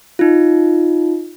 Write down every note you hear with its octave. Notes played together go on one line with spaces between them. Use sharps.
D#4 F4